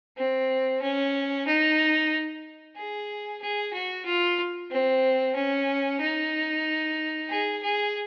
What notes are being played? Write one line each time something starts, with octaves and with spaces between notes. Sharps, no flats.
C4
C#4
D#4
G#4
G#4
F#4
F4
C4
C#4
D#4
G#4
G#4